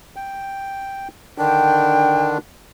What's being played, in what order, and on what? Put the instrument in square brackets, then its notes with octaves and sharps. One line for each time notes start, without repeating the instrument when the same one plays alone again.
[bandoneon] G5
[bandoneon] D3 D#3 D4 [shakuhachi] G5